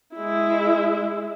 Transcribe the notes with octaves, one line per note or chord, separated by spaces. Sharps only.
G#3 E4